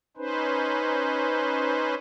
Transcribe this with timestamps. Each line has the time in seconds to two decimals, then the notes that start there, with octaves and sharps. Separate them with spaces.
0.17 C#4 D#4 B4 C5